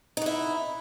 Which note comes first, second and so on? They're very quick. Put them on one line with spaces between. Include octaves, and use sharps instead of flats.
D#4 F#4 E4